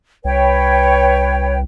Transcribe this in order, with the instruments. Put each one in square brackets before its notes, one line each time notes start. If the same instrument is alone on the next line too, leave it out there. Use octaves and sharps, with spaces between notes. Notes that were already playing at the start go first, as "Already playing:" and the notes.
[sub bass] C2 [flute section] B4 C#5 G5